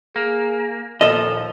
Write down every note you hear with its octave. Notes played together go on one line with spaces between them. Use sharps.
A#3 G#4
D#2 A#2 F3 A4 D#5